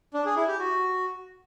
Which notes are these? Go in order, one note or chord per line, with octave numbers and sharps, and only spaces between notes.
D4
G#4
E4
G4
F#4